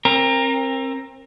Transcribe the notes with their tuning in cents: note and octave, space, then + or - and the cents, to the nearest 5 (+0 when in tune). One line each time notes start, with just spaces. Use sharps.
C4 +30 A#4 +0